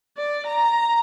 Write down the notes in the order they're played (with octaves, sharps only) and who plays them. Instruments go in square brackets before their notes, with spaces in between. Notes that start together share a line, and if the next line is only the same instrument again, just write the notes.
[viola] D5
A#5